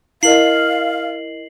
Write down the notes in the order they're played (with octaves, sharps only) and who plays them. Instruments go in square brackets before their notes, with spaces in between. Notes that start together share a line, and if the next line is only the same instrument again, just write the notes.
[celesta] E4 A#4 D#5 [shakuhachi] F5 [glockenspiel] C7 F#7